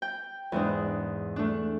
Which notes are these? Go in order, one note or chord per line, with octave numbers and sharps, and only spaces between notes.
G5
E2 G#2 D4
A3 D4